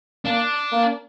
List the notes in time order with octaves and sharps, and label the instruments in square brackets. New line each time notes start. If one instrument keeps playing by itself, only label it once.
[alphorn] A#3 [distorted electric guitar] D4
[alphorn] A#3